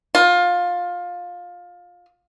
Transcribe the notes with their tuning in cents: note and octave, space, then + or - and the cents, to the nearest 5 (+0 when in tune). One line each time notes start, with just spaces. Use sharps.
F4 +20